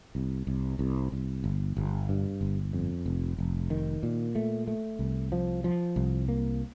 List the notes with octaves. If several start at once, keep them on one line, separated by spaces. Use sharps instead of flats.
C2
C2
C2
C2
G1
G1
G2
G1
F2
F1
F1
D#3
A#2
A3
A3
C2
F3
F3
C2
A#3